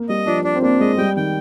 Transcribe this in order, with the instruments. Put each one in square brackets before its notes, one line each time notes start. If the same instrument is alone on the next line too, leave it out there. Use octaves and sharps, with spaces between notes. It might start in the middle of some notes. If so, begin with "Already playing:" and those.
Already playing: [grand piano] A#3
[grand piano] G3 [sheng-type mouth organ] D#5
[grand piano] F3 [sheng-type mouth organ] D4
[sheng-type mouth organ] D4
[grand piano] C4
[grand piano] A#3 [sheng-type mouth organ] D4
[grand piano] G#3 [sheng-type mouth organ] D#5
[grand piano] G3 [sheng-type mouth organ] G5
[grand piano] D#3 [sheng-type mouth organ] G5